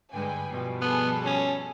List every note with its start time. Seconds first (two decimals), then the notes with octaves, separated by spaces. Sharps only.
0.13 G2 D3 G#3 B4 G5 G#5
0.48 B2 F3 G3
0.81 B3 G#4 A4 A5
1.25 C#4